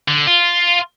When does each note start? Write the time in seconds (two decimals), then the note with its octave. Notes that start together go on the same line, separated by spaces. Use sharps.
0.08 D3
0.27 F4